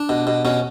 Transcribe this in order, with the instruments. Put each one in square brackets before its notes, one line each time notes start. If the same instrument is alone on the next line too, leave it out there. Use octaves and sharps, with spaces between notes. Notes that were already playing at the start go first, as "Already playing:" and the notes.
Already playing: [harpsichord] D4
B2
B2
B2 C#4